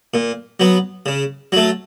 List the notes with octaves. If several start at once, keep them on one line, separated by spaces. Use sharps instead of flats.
A#2
F#3 B3
C#3
F#3 A3